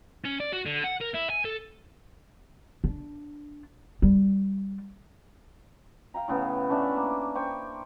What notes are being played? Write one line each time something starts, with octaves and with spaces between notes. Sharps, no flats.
C#4
D5
F#4
D3
F#5
A#4
E4
G#5
A4
D4
G3
F5 G5 A#5
A2 C#3 B3
A3 C#4 D4 E5
A#3
C5 G5 C#6